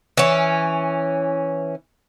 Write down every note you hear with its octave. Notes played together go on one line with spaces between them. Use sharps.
E3 C#4